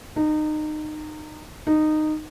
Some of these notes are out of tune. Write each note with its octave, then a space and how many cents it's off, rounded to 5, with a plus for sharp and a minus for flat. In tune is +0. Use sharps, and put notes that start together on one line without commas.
D#4 -25
D#4 -15